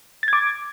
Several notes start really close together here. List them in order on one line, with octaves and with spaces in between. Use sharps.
A6 G#6 D6